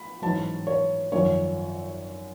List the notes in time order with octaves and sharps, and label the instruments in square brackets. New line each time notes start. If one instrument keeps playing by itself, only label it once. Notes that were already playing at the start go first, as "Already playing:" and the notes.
Already playing: [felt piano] B5
A1 G#2 F#3 A5
C#5
G#1 F#2 F3 C#5